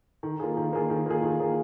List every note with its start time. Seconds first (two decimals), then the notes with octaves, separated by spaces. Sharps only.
0.23 D#3
0.40 A#3 F4 G#4
0.57 D#3
0.73 A#3 F4 G#4
0.90 D#3
1.06 A#3 F4 G#4
1.23 D#3
1.40 A#3 F4 G#4